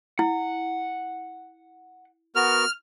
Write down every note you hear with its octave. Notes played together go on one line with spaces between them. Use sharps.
E4 F#5
B3 F#4 A#4 F6